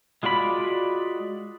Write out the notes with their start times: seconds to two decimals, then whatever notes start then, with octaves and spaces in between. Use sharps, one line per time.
0.23 G#3 F4 F#4 D5 B5